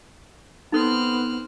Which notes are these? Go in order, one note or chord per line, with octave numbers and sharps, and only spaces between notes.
B3 C4 D#4 A4 F6 F#6